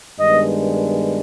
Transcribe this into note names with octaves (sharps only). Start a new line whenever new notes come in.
G2 D#3 G#3 B3 D4 D#5